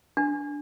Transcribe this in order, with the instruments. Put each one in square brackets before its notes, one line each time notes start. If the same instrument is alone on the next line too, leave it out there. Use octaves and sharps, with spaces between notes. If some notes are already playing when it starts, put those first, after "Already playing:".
[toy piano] D4